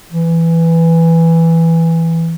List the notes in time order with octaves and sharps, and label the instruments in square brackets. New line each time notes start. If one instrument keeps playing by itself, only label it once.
[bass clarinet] E3